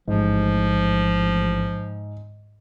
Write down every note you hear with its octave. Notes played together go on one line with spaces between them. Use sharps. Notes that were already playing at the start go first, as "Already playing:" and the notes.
A1 G#2 F3